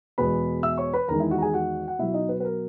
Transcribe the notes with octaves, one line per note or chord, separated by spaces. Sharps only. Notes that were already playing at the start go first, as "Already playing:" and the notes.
E2 B2 G#3 B4 B5
E5 E6
C#5 C#6
B4 B5
E2 D#3 G#3 A#4 A#5
E4 E5
F#4 F#5
A#5
G#4 G#5
F#4 F#5
F#5
B2 F#3 E4 E5
D#4 D#5
B4
B4
A#4